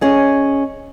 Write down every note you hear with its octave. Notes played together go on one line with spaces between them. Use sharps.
C#4 G#4 D#5